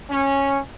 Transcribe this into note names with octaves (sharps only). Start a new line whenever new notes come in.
C#4